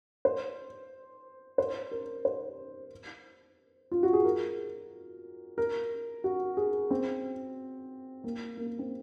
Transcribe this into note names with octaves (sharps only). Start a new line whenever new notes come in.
C5
C5
A#4
C5
F4
F#4
G#4
A#4
A#4
F#4
G#4
C4
A#3
A#3
C4